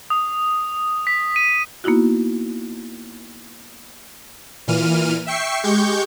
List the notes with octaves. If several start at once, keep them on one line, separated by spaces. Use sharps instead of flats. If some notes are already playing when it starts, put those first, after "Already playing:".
D#6
B6
D#7
A#3 B3 D#4 E4 F#4
A#2 E3 F6 D#7
E5 G5 C#6 C7
G#3 G4 C#6 G6